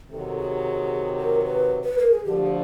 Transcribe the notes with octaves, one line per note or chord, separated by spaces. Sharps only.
C3 D#3 F#3 A4
G#4
A#4
A#4
B4
B4
A#4
G#4
D2 D3 F3 G4